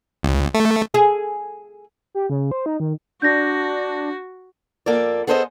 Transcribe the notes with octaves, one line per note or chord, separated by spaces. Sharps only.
C#2
A3
G#4
G4
C#3
C5
D#4
D#3
D4 F#4 G6 A#6
F2 A#3 A4 D5
B3 G#4 A4 C5 C#5 D#5